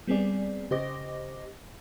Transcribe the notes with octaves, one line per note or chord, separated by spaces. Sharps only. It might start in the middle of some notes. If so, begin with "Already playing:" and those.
G3 B3 C4 G#4 D5
C#3 G4 C5 D#5 D6 A#6